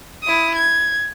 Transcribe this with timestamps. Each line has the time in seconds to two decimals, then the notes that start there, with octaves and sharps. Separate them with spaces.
0.24 E4 D#6
0.56 G#6